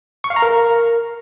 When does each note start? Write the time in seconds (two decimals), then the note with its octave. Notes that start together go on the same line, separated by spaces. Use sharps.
0.24 C#6
0.30 F5
0.36 A#5
0.42 A#4